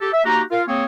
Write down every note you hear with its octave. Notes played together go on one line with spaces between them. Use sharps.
G4 A4
E5
A#3 D#4 F#4 G4 F#5 A#5
F4 A#4 F5
A#3 C4 G#4 C#5